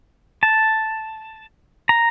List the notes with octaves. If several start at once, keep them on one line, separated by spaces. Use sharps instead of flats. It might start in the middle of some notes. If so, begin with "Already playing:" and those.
A5
A#5